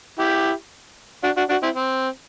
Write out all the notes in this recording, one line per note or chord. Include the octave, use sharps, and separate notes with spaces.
E4 G4
D4 F#4
D4 F#4
D4 F#4
C4 E4
C4